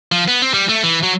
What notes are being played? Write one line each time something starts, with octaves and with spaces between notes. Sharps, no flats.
F3
B3
C4
G3
A3
E3
F#3